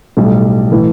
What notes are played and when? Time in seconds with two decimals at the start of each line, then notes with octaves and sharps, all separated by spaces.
0.17 B1 A2 G3
0.72 A2 E3